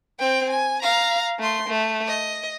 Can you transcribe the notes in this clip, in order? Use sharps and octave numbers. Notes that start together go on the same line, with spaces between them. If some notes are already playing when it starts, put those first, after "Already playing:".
C4 G5
G#5
F5 A#5
A3 C6
A3
D#5